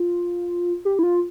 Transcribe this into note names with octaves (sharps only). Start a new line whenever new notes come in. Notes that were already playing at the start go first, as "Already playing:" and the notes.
Already playing: F4
G4
E4
F4